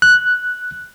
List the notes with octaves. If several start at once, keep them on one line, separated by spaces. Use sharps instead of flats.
F#6